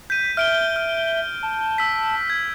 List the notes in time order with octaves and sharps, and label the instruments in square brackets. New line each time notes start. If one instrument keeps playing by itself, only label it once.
[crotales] G6 D#7 [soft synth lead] B6
[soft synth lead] E5 [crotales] F6 D7 G7
[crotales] F6
[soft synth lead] A5
[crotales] E6 B6
G#6